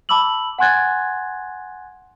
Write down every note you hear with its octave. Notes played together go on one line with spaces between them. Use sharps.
A5 B5 D6 E6 F#7
F#5 G#5 C6 F#6 G#6 A6